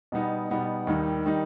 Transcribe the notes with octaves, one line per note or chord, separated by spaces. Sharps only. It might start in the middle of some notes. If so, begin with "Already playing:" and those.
B2 G3 B3 D#4
B2 G3 B3 D#4
D#2 D#3 G3 D#4
D#3 G3 D#4